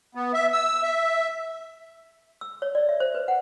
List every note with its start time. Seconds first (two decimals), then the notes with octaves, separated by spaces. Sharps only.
0.15 B3
0.34 E5
0.53 E6
0.82 E5
2.41 E6
2.62 C#5
2.75 D5
2.89 E5
3.00 C5
3.15 B4
3.28 F#5